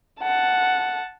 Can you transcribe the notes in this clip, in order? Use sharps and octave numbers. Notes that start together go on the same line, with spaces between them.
F#5 A5